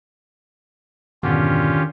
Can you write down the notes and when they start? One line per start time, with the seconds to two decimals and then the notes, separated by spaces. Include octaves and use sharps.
1.23 F2 G#2 B2 D3 D#3 C#4 F4 G4